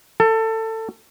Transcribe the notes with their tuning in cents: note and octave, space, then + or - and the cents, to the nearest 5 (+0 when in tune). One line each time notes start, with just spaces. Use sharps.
A4 +20